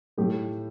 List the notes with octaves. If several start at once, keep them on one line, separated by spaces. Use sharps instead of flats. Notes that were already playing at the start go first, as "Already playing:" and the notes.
A2 A3 D#4 G4